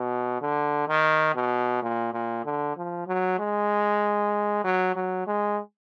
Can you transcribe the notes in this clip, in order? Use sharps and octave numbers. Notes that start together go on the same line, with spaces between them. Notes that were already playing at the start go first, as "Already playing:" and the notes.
Already playing: B2
D3
D#3
B2
A#2
A#2
D3
F3
F#3
G#3
F#3
F#3
G#3